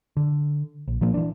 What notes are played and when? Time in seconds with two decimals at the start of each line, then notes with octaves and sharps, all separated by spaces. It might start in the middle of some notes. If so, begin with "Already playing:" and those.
0.17 D3
0.88 A#1
1.01 A#2 F3 A#3
1.14 E3 D4